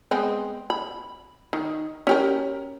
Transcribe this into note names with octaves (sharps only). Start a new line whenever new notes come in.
G#3 B3 C4
B5
D#3
C#4 G4 A#4